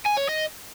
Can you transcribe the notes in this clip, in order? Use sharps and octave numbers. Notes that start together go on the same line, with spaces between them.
G#5
C#5
D#5